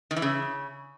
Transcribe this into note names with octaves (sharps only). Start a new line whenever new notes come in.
D#3
E3
C#3